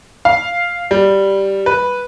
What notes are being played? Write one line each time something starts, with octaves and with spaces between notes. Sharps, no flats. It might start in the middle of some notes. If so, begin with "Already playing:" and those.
F5
G3
B4